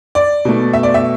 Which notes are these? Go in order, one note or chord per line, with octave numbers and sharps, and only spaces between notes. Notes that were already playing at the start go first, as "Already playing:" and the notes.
D5
B2 A3
E5
D5
E5